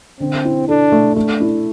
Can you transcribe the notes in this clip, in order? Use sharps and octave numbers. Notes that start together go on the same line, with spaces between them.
D3 C4
E4
D4 A4
A3
A3 D4
E4